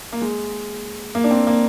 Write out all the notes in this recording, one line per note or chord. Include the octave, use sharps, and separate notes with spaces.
A#3
G#3
A#3
D4
C4
A#3